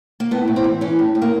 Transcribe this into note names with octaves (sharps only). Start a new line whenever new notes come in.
A#3
A2 B3
A2
C4
E3
E3 C#4
A2
A2
A#3